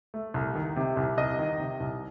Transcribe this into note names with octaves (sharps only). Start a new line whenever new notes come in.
A3
C2
D#3
C3
C2
C2 D#5
D#3
C3
C2